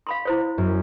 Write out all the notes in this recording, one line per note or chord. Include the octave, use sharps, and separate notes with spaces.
F5 B5 C6
E4 C5 C#5
F#2